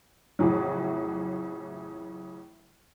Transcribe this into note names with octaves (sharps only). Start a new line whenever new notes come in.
F2 A2 C#3 E3 F#3